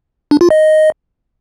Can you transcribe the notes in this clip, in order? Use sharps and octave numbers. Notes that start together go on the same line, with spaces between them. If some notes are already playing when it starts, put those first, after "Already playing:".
D4
F4
D#5